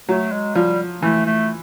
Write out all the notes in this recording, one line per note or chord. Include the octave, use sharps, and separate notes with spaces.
F#3 A3
G#3
F3 G3
E3 A3
A3